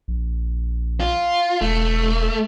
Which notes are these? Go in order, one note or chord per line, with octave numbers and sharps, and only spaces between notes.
A#1
F4
E1 A3